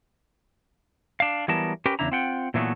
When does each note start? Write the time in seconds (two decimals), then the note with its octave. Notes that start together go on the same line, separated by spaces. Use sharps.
1.20 D4 F5
1.48 E3 F#3 G3 B3 A#4 A5
1.86 C#4 G4 A#4 B4 G5
1.99 E2 C#3 D4 E4 A#5
2.12 C4 F4 F#5 G5
2.54 A#2 E3 F#3 A3 B3